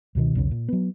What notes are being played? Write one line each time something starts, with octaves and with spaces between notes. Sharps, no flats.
C#2 B2 D#3
B1 E2 C#3
A#2
F#3 B3